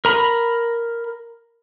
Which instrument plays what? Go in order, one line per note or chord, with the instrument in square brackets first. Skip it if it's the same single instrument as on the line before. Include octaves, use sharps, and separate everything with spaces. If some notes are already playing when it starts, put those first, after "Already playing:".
[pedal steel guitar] A#4 A#5 B5